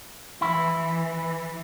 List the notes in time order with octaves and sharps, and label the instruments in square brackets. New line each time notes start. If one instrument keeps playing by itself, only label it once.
[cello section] E3 [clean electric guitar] E4